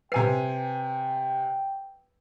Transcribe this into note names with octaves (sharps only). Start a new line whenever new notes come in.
C3 B4 G5 G#5 C7